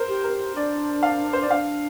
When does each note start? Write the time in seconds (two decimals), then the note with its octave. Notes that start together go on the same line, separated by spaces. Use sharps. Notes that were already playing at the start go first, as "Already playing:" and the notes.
Already playing: A#4 C5
0.08 G4
0.24 A#4
0.55 D4 D5
1.03 F5
1.33 C5
1.42 D5
1.50 D4 F5